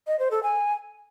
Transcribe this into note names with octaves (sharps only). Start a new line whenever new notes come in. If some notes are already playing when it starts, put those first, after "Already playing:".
D#5
C5
A4
G#5